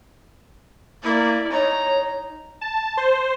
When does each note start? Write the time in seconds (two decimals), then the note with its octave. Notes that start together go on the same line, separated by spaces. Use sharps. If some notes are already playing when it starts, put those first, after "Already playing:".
1.04 A#3 E4 D5
1.52 D#4 C#5 A#5
2.61 A5
2.97 C5